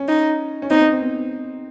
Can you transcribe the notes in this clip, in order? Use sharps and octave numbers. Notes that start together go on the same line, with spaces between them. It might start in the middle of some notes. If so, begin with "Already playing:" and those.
Already playing: C#4
D#4
C#4
C4 D#4
C4
C4
B3